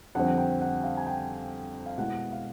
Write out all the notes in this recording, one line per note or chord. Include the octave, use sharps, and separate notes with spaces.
F2 D3 G3 C4 F#5
G5
F#5
F5
G#5
G5
F5
B2 G#3 B3 E4 F#5
F5